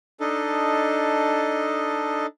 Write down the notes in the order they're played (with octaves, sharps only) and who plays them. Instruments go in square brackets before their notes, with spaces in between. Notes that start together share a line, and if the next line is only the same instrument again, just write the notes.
[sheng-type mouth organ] D4 D#4 A4 D#5